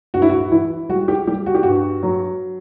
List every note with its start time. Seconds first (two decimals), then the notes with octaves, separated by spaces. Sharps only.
0.14 G2 F#4
0.22 E4
0.30 F#4
0.52 E3 E4
0.89 G3 F#4
1.08 G4
1.27 G3 G4
1.46 F#4
1.55 G4
1.63 G2 F#4
2.03 F#3